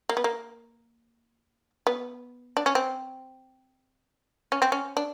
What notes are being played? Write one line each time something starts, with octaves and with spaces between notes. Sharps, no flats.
A#3
B3
A#3
B3
D4
C#4
C4
C#4
C4
C#4
D4